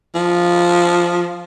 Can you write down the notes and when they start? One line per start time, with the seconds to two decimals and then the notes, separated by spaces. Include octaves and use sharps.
0.15 F3